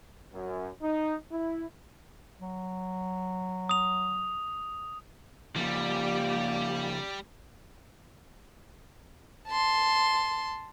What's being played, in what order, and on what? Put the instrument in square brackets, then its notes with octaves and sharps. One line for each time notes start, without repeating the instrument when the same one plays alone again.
[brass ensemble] F#2
D#4
E4
[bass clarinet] F#3
[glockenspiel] D#6 F7
[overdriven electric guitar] C#3 F3 [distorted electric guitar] G3 [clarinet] A#3 [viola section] G4 D5
[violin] A5 C6